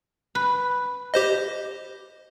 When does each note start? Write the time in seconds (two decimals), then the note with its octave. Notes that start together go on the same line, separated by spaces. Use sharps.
0.35 B4
1.14 G4 C5 D#5